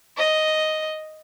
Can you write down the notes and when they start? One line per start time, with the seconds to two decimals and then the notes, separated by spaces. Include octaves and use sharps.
0.17 D#5